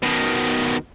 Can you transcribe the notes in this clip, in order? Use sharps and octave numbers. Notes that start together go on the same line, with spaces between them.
B2 D#3